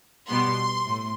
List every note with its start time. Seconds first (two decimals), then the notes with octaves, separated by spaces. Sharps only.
0.29 B2 G3 B3 C6
0.86 A2